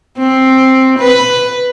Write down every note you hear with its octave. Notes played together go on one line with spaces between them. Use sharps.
C4
B4